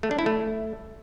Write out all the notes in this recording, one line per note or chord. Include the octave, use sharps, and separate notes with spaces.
A3
D4
E4
A3